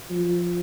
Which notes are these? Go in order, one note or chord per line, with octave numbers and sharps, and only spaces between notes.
F3